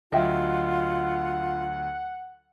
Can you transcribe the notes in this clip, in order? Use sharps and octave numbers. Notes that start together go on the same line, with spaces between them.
D2 F#3 F4 D#5 E5 F#5 G5